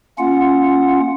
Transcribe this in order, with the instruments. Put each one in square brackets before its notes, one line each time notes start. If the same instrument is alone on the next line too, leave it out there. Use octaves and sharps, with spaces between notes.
[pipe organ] A#3 C#4 F4 F#5